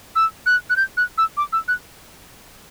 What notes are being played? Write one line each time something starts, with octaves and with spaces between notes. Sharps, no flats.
E6
F#6
F#6
G6
F#6
E6
D6
E6
F#6